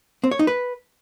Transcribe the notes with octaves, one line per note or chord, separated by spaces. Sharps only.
C4
C#5
D#4
B4